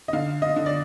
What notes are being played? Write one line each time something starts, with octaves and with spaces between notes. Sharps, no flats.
D#5
D3 F5
D#5
D3
D5